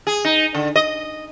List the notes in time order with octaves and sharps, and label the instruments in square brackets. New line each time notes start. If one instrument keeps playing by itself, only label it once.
[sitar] G#4
D#4
D3
D#5